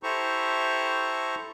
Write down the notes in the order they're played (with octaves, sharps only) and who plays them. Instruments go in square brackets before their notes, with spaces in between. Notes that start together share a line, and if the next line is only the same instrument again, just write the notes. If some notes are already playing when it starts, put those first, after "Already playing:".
[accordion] E4 G4 A4 C5 A#5 C#6